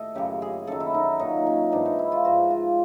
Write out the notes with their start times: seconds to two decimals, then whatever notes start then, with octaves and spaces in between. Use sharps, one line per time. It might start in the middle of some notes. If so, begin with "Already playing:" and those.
Already playing: A2 A4 D#5
0.15 F#2 C#3 F#3 G4
0.42 G#4
0.67 F#2 D#3 F#3 A4
0.80 E4
0.94 D#4
1.19 A#2 F#3 D#4
1.46 C#4
1.72 G#2 E3 D4
1.86 D#4
1.99 E4
2.12 F4
2.24 G#2 F3 F#4
2.50 F4